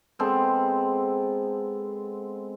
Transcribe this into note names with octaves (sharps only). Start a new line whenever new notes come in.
G#3 B3 C4 A4